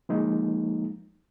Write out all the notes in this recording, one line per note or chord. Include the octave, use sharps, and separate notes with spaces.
F3 G#3 A#3 D#4